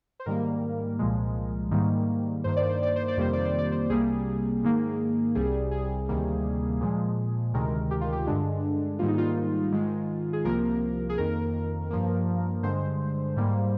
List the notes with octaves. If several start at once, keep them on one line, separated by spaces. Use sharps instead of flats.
C5
G#2 D#3 G3 A#3 A#4
C2 A#2 F3 G#3
G#2 D#3 G3 A#3
G2 D#3 A#3 C5
D5
C5
D5
C5
D5
F2 C3 D#3 G3 A#3 C5
D5
C5
D5
C5
C2 C3 G3 A#3 G#4
G#2 D#3 A#3
C2 C3 G3 G#4
G#4
D2 C3 D#3 G3 A#3
A#2 F3 G#3
D2 C3 D#3 G#3 A#4
G4
F4
G4
G2 D3 G#3 D4
G#2 D#3 G3 A#3 F4
D#4
F4
G#2 D#3 G#3
G#4
C2 C3 F3 A#3 A#4
G#4
F2 D#3 A#3 A#4
G2 F3 A#3
G2 D3 G#3 C5
G#2 G3 A#3